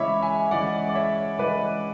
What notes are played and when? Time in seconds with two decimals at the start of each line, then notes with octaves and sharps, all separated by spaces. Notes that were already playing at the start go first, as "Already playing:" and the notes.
Already playing: C#3 E3 G#3 C#5 E5 B5 D6
0.22 E5 G#5
0.51 C#3 E3 G#3 D5 F#5
0.89 D5
0.95 C#5 E5
1.38 C#3 E3 G#3 B4 D5